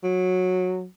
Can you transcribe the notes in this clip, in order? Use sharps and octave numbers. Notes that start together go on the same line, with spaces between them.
F#3